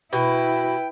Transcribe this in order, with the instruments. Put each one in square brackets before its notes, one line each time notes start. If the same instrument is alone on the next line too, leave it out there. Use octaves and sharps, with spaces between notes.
[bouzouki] B2 [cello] E4 B4 [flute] G5